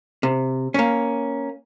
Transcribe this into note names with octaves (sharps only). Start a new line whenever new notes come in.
C3
A#3 C#4